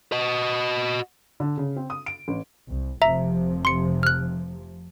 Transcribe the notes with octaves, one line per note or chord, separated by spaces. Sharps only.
F#4 D#5
D3
C#3
C4
D#6
D7
A1
C2
F1 C3 F3 E5 A#5
C6 C#7
F6 F#6